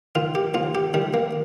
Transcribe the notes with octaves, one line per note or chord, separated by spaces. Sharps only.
D#3 F4
G4
D#2 F4
G4
D#3 G3
A#3